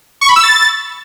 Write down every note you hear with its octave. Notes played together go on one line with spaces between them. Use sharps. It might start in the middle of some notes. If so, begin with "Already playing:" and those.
C#6
B5
E6
A6